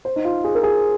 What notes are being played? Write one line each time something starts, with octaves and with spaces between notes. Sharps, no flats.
C5
D#4
F4
G#4
A#4
G#4